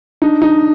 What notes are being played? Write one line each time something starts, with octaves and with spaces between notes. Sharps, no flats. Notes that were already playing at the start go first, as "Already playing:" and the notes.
D4 D#4
D#4